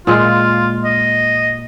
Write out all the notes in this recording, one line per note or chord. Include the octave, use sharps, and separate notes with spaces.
A#2 G#3 F4
D#5